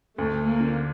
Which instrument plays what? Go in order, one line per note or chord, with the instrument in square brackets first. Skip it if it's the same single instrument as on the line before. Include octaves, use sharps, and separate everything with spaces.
[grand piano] D2 [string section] A3
[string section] A#3
[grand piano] D3